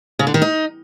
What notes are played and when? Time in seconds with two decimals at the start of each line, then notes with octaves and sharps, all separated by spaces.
0.19 C#3
0.27 D3
0.34 D#3
0.42 D#4